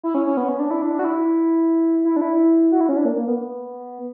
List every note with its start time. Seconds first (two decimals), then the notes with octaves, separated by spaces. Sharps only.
0.04 E4
0.15 C#4
0.26 C#4
0.37 B3
0.49 C#4
0.59 D4
0.71 E4
0.82 D4
0.94 D4
0.99 F#4
1.04 E4
2.05 E4
2.16 D4
2.21 E4
2.72 F#4
2.81 E4
2.89 C#4
2.97 D4
3.05 A#3
3.16 A#3
3.28 B3